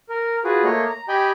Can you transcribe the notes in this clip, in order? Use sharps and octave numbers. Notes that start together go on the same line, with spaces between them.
A#4
F4 F#4 G#4 B4
A3 A#3 C#5 D#5
A#5
G4 D#5 G5 G#5 B5 G6